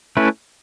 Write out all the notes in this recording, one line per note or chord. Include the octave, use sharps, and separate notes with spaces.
A3 C#4 E4 B4